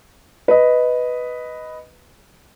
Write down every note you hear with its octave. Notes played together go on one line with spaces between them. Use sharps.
B4 D#5